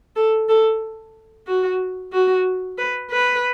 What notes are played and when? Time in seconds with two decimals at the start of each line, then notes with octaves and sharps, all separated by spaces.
0.16 A4
0.49 A4
1.47 F#4
2.12 F#4
2.78 B4
3.10 B4